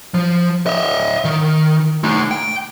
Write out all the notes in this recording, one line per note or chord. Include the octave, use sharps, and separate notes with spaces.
F3
D#5 E5
D#3
A3 D#4
G5